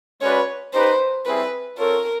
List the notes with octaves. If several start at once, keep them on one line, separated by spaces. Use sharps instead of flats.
G#3 C#4 F#4 B4 C#5 D5
D#4 G4 B4 C5
G3 C4 E4 G#4 B4
C4 F4 A4 A#4 C#5